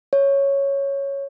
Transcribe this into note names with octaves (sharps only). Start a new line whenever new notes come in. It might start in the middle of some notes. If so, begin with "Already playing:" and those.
C#5